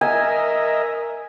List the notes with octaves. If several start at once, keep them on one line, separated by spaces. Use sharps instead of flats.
A#4 D#5 E5 G#5